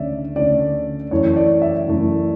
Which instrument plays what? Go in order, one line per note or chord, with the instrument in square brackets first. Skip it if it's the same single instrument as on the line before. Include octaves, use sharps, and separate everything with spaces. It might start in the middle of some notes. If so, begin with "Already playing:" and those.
Already playing: [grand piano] D2 D3 A3 C#4 D5 E5
D2 D3 A3 C#4 D5
F#2 E3 A3 E4 C#5
D5
E5
F#2 E3 A3 E4